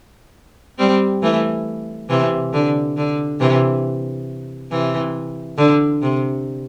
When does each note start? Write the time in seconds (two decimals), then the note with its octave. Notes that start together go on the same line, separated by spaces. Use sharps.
0.79 G3 C4
1.23 E3 A3
2.10 C3 E3
2.53 D3
2.97 D3
3.40 C3 E3
4.71 C3 E3
5.58 D3
6.02 C3